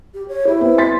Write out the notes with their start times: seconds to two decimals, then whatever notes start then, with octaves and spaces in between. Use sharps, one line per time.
0.14 G4
0.28 C#5
0.48 E4 G4
0.61 B3 C4
0.78 C6 A6 B6